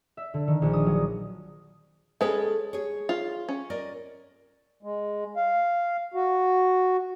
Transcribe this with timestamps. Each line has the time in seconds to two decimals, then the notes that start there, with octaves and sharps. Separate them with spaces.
0.17 E5
0.34 D3
0.48 D#3
0.62 A#1
0.73 D#6
0.86 F#3
2.21 G#3 C#4 G#4 A4 B4
2.73 G#4 C#5
3.09 F4
3.49 C#4
3.70 A#4 D5 D#5
4.83 G#3
5.36 F5
6.14 F#4